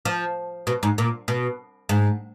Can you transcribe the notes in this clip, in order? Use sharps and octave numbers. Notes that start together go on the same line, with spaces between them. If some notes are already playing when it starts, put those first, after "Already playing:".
F3
B2
G#2
A#2
B2
G#2